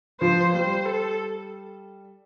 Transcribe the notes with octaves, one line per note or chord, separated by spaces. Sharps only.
F3 C5
G3 C5
A4